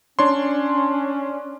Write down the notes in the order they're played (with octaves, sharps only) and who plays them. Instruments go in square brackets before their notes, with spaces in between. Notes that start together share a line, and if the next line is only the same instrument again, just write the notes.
[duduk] C#4 [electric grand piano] D4 C#5 C6